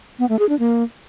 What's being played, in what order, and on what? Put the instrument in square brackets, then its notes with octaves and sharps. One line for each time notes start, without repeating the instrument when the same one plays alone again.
[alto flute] B3
A3
G#4
D4
A#3